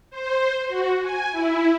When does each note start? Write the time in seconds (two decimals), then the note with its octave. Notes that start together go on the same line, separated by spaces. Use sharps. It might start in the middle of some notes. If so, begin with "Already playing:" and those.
0.11 C5
0.68 F#4
1.02 G#5
1.32 E4